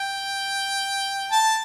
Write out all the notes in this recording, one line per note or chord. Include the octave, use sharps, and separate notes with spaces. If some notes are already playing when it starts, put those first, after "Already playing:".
Already playing: G5
A5